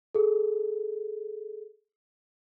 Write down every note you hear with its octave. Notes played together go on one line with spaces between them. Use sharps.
G#4 A4